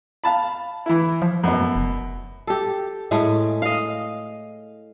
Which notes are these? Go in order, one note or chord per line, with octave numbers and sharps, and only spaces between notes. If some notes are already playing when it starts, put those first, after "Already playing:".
F5 A5 B5
E3 E4
F3
F#2 B2
F1
G4 A4
A2 G#3 A3
D#5 F5